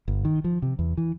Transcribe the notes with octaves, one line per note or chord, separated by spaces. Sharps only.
G1
D#3
F3
C3
E2
E3